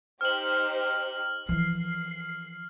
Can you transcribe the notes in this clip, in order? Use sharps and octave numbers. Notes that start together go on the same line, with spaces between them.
D#4 G4 C5 F6 F#7
E3 F3 C7